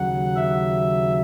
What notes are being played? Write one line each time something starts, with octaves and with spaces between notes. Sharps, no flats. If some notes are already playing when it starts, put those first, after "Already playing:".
Already playing: D#2 C#3 F#3 F#5
E5